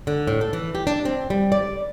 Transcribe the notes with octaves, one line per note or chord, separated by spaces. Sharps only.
D3
A2
A4
E3
G4
D4
C4
G3
D5